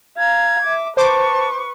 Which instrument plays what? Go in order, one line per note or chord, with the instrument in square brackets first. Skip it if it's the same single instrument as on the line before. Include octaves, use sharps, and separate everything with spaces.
[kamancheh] F5 A#5 [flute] G#6
[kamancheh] E5 D6
[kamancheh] B4 C#6 [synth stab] C5 D6 [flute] A5